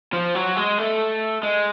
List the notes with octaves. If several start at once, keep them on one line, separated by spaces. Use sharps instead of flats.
F3
F#3
G#3
A3
G#3